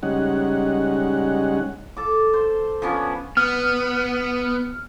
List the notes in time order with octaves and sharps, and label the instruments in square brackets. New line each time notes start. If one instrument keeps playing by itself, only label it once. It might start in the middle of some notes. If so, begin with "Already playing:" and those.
[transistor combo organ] C#3 G3 G#3 C#4 D#4 F#5
[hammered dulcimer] A4 D6
C5
F3 B3 C#4 D4
[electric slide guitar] B3 [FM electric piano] F6